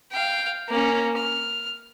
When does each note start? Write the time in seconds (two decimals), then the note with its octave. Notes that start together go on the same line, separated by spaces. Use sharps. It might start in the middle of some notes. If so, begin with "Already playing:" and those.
0.11 F5 G5
0.68 A#3 C#4
1.16 F6